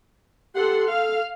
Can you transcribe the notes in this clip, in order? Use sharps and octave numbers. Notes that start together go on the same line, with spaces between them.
G4 A4 F#5 C6
A4 F5